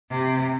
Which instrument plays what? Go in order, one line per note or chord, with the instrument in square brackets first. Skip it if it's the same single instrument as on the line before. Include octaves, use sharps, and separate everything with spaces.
[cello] C3